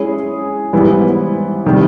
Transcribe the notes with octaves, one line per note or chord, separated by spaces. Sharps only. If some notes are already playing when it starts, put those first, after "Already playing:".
Already playing: G#3 C#4 E4 G#4 C#5
G#2 E3 G3 B3 E4
C3 D#3 G3